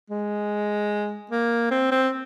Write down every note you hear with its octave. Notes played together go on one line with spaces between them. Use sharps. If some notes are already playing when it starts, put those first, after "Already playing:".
G#3
A#3
C4
C4